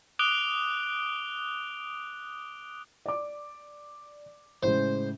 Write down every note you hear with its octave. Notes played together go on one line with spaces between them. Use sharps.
D6 D#6 F#6 D7 F7 G7
D5 D6
A2 C#3 G#3 C5